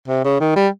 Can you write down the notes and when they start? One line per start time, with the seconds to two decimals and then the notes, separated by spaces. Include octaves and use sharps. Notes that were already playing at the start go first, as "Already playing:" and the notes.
0.08 C3
0.25 C#3
0.41 D#3
0.56 G3